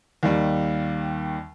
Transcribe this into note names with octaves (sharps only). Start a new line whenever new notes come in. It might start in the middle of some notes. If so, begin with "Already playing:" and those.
D#2 D#3 G3